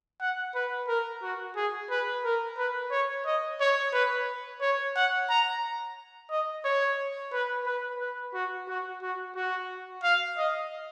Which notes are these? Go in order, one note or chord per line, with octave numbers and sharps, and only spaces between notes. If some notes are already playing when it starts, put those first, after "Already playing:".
F#5
B4
A#4
F#4
G#4
B4
A#4
B4
C#5
D#5
C#5
B4
C#5
F#5
A#5
D#5
C#5
B4
B4
B4
F#4
F#4
F#4
F#4
F5
D#5